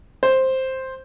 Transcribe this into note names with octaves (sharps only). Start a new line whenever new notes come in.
C5